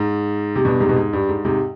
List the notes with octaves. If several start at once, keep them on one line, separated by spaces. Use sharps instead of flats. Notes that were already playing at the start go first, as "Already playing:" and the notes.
Already playing: G#2
C3
G2 B2
G#2 C3
B2
G#2
G2
G#2
G#2 C3